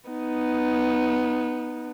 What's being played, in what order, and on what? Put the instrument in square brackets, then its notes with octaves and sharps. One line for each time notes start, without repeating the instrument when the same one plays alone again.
[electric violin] B3 D#4